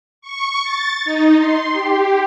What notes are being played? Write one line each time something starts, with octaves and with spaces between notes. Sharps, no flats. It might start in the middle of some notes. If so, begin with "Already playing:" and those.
C#6
A6
D#4
C6
G4